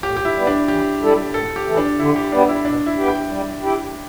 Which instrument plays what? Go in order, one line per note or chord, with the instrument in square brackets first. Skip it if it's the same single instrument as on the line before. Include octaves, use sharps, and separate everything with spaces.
[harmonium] A2 [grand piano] G4
[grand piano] G4
E4
[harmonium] G3 B3
[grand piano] D4
[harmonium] E3 [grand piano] G4
[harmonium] G3 E4 A4
[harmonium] A2 [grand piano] A4
[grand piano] G4
[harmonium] E3 A3
[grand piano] D4
[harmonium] D3 [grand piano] E4
[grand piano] G4
[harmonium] G3 B3 [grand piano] D4
[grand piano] E4
[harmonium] B2 [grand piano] D4
[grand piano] E4
[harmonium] B3 G4
[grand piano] G5
[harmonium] G3
E4 G4